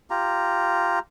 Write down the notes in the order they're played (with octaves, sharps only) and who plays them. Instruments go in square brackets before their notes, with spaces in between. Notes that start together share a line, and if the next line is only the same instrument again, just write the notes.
[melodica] F4 G4 A#5